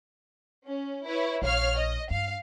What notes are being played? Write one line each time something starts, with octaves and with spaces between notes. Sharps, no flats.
C#4
E4 B4 C#5
A#1 C#5 F5 F6
D#5
G2 F5